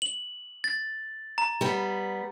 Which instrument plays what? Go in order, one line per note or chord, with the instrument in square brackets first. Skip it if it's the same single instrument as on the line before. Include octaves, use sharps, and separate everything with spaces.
[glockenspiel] F#7
A6
A#5
[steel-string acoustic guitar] G3 B3